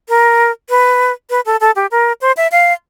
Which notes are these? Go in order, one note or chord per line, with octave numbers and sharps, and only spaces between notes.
A#4
B4
B4
A4
A4
G4
A#4
C5
E5
F5